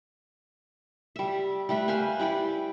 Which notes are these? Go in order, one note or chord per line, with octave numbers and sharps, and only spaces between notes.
G3 E5
G3 A3 B4 E5
B4 C5 F5 G#5
G3 E4 D5 G5